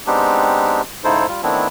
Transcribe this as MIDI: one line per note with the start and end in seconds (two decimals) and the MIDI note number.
0.07 0.82 56
0.07 0.82 59
0.07 0.82 60
0.07 0.82 62
0.07 0.82 63
0.07 0.82 67
1.04 1.27 44
1.04 1.27 49
1.04 1.27 63
1.04 1.27 64
1.04 1.27 69
1.04 1.27 72
1.28 1.41 55
1.28 1.41 65
1.43 1.68 51
1.43 1.68 57
1.43 1.68 59
1.43 1.68 60
1.43 1.68 62
1.43 1.68 64